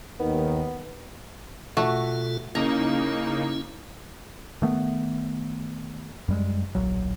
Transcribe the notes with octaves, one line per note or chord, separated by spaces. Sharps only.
D#2 D#3 B3
B2 A3 F4 F#4 A4
C#3 A#3 C#4 D#4 E4 A#5
D#3 A3 B3
F#2 G3 G#3
D1 A#1 F#3